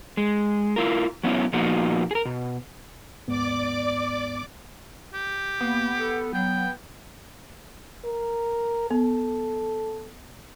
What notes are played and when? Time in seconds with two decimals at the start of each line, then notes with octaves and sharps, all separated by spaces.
0.17 G#3
0.76 E4 F4 A#4
1.23 F#3 B3 C#4 E4
1.53 A#2 F3 A#3 B3 D#4 F#4
2.11 G#4 A#4
2.25 B2
3.28 D#2 G#2 B3 D5 D6
5.14 G4
5.60 A#3 B3
5.97 A4
6.34 F#3 G5
8.05 A#4
8.91 B3 A4